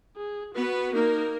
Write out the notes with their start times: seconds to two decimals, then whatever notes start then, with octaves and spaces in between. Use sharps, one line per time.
0.16 G#4
0.55 B3 F#4 B4
0.93 A#3 D#4 A#4